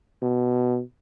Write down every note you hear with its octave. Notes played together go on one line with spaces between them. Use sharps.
B2